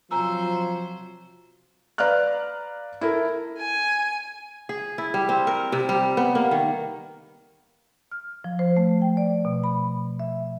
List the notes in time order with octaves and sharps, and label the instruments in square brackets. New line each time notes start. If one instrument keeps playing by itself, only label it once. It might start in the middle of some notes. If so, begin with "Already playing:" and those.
[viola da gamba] C3 F#3 C5 [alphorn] F3 [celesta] G#5 A#5 E6
[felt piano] B4 D5 F5 A#5 F6 F#6
E4 A4 A#4
[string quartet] G#5
[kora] G#4
E4
G3
C4
A#4
C3
G3
B3
A#3
D#3
[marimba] F6
F3
C5
A3
G5
D5
B2
B5
E5